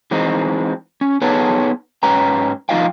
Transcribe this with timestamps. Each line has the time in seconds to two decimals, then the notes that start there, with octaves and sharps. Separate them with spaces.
0.11 E3 G#3 C4 D#4
1.01 C#4
1.21 B3 D#4 G#4 A4 B4 C#5
2.03 G#2 C#4 B4 G5 A#5
2.69 F3 D#4 F4 D#5 F5 G5